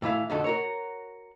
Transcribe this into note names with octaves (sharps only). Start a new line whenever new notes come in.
A2 E3 E4 F5
F2 D3 F#4 A4
F#4 A#4 C#5